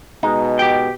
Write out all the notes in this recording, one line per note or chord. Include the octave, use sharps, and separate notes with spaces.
B2 G#3 D#4
G4 G5